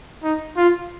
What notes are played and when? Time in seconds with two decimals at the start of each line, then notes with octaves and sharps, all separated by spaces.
0.23 D#4
0.57 F4